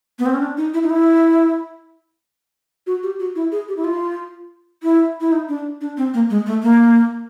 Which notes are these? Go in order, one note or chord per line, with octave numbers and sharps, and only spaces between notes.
B3
C4
C#4
D4
D#4
E4
D#4
E4
F#4
G4
F#4
E4
G#4
G4
E4
F4
E4
E4
D#4
D4
D4
C4
A#3
G#3
A3
A#3